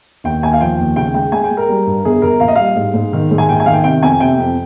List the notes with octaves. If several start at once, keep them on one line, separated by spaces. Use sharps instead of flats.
D#2 G5
D#2 G#5
F5
F3 G5
D#2
C#3 G5
G#3 G5
G#3 G#5
G5
G#3
A#4
G3
G2
G1 G#4
G1 A#4
A#1 F5
D#5
G3 F5
G#2
G#2
D#3
G#2
G#5
A#1 G5
G#5
D#3 F5
G5
C3 G5
F2 G#5
C3 G5
F2